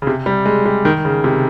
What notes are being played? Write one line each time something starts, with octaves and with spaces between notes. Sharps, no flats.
C#3
C3
G3
G#3
G3
D#3
C#3
C3